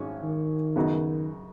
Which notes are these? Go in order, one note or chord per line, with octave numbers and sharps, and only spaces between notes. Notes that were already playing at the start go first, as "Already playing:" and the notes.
Already playing: G#1 G#2 G#3 C#4 F#4
D#3
F#2 C#3 B3 D#4 F#4